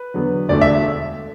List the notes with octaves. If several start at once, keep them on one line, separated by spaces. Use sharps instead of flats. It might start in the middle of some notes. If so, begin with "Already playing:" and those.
Already playing: B4
E2 D3 F#3 B3
E1 D2 D3 A3 D5
E5